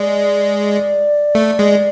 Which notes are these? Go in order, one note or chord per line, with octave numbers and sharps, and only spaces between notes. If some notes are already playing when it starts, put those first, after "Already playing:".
Already playing: G#3 D5
A3
G#3